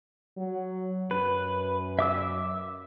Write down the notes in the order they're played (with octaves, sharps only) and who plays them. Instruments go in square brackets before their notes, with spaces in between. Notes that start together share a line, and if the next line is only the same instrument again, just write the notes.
[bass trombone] F#3
[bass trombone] F#2 [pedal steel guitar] B4
[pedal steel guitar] E5 D6 E6